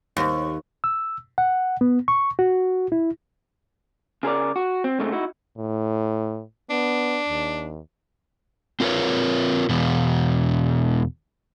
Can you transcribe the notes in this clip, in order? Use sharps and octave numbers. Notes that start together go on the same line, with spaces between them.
D#2
E6
F#5
B3
C#6
F#4
E4
C#3 G#4 A#4 D5
F#4
C4
G#2 C#3 G#3 A3 C4
D#4 E4 F#4
A2
B3 D4
D#2
C4 F4 A#4 B4 C#5
E2 B2